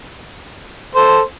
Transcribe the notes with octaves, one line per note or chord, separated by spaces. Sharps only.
A4 C5